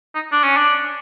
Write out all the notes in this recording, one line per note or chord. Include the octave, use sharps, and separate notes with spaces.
D#4
D4
C#4
D4